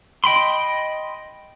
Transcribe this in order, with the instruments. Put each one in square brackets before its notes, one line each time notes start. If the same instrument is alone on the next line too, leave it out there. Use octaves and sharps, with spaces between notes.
[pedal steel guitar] D#5 G5 B5 C6